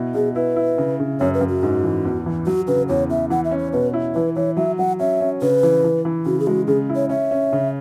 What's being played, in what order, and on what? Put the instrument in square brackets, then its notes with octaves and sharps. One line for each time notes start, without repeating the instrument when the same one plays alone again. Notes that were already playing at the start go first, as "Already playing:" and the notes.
Already playing: [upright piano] B2 E4
[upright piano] B2 [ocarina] G#4
[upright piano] E4 [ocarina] B4
[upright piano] E4
C#3
C#3
[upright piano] F#2 [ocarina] C#5
[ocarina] B4
[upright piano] F#2
[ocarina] F#4
[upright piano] G#2
E3
E2
E3
[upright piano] F#3 [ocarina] F#4
[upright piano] C#3 [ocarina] B4
[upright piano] E2 [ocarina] C#5
[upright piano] E2 [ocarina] E5
[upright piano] E3 [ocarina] F#5
[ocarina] E5
[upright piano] C#4
[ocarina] C#5
[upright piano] B2 [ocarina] B4
[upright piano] E4
[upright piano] E3 [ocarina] B4
[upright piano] E3 [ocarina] C#5
[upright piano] F#3 [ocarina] E5
[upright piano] F#3 [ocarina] F#5
[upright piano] C#4 [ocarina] E5
[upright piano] C#4
[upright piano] C#3 [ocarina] B4
[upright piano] E3
E3
E3
[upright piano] C#3 [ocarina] F#4
[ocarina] G#4
[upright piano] G#3 [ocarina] F#4
[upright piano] C#3 [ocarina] G#4
[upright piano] E4
[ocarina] C#5
[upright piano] C#4 [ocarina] E5
[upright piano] C#4
C#3